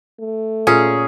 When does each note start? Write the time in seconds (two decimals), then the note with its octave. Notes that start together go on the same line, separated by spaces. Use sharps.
0.20 A3
0.67 A#2 C#4 G#4